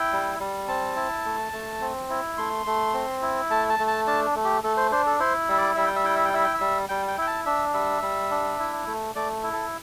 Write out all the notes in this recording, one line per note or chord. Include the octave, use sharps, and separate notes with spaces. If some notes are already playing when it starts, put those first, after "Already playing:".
Already playing: E4 G5
G3
G3
C4 A5
E4
A3
A3
C4
E4
A3 C6
A3
C4
E4
A3 A5
A5
A3
A5
D4 A5
A3
G4
A3 A4
C5
D4 C5
A4
E4 C5
G3 E5
D5
G3 E5
G5
E5
E4 G5
E5
G5
E4 E5
G5
E5
G3
G3 G5
G5
E4 G5
A5
D4 E5
G3 E5
G3
D4
E4
A3
A3 D5
E4
A4